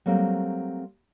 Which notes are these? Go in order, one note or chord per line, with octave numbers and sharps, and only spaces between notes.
F#3 G3 A3 A#3 C4